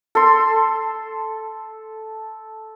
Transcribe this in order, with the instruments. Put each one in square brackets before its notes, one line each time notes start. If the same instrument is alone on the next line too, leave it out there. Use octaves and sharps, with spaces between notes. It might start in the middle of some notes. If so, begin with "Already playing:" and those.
[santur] A4 C6